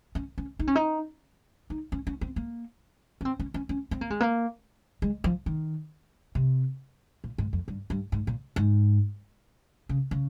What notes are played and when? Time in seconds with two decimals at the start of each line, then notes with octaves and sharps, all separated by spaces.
0.15 C#4
0.38 C#4
0.59 D#4
0.67 C#4
0.75 D#4
1.70 D#4
1.92 C#4
2.07 C#4
2.21 C4
2.36 A#3
3.21 C#4
3.25 C4
3.40 C#4
3.54 C#4
3.69 C#4
3.91 C4
4.01 A#3
4.10 G#3
4.20 A#3
5.02 G#3
5.24 F3
5.46 D#3
6.35 C3
7.24 A#2
7.38 G#2
7.53 F2
7.68 G2
7.90 G2
8.12 G#2
8.27 A#2
8.56 G#2
9.89 C#3
10.11 C#3